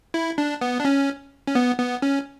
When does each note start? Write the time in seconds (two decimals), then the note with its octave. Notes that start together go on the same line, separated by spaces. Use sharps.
0.14 E4
0.38 D4
0.61 B3
0.80 D4
0.85 C#4
1.47 C#4
1.55 B3
1.79 B3
2.02 C#4